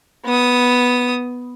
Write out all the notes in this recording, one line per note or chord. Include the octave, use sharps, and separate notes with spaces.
B3 D#6